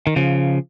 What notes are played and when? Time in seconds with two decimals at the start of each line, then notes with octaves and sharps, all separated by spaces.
0.07 D#3
0.16 C#3 F3